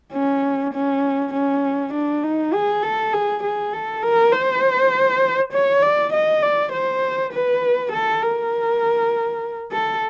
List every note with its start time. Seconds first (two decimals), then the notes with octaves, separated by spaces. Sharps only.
0.13 C#4
0.74 C#4
1.33 C#4
1.93 D4
2.23 D#4
2.53 G#4
2.83 A4
3.13 G#4
3.43 G#4
3.73 A4
4.02 A#4
4.32 C5
5.52 C#5
5.82 D5
6.13 D#5
6.42 D5
6.72 C5
7.32 B4
7.92 A4
8.22 A#4
9.71 A4